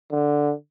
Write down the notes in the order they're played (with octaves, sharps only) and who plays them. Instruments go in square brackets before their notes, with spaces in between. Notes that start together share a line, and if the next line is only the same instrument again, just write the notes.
[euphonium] D3